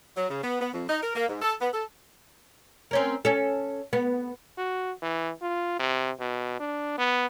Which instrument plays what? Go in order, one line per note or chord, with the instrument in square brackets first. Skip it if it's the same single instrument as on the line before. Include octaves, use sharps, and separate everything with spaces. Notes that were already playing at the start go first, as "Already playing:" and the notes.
[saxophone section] F#3
C#3
B3
B3
F2
D#4
A#4
A#3
G#2
A4
B3
A4
[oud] C4 C#4 A#4
C#4 A4
B3
[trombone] F#4
E3
F4
C3
B2
D4
B3